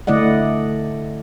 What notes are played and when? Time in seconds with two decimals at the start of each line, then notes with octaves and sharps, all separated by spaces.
0.07 D3 A3 E4 D5 D#5 F#5